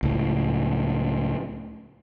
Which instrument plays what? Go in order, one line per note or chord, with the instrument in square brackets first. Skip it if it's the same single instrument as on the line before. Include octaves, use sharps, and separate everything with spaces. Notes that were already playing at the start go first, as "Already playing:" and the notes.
[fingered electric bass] C#2 A2